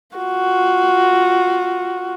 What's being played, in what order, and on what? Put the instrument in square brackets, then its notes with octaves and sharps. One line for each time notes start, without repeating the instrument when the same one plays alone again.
[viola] F4 F#4